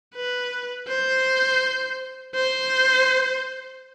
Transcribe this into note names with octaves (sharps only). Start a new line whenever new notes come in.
B4
C5
C5